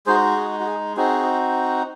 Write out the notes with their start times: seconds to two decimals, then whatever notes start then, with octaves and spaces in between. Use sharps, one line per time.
0.06 G#3 D#4 F#4 G#4 C5
0.37 G#4
0.60 F#4
0.66 G#4
0.97 C4 D#4 F#4 G#4